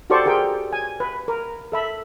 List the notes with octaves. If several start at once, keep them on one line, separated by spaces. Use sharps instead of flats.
F#4 G4 A4 C5 D5 C#6
G4 G#4 A#4 G5
G#5
B4
A#4
A4 E5 B5